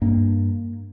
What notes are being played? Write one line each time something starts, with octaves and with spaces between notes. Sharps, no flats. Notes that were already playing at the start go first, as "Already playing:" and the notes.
G2 A#3